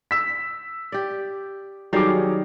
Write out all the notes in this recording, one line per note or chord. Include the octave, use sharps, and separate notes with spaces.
E6 B6
G4 D5
D#3 F#3 G3 G#4 F5 D6